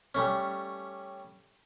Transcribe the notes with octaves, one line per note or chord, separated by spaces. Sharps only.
G3 A3 C#4